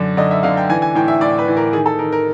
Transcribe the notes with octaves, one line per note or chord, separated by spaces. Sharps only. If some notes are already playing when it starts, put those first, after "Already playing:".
Already playing: F#2 D3
D3 D#5
E5
D3 F5
G5
E3 G#5
G#5
A2 G5
E5
A2 D5
B4
E3
A#4
D#3 G#4
A4
D#3 A#4
A#4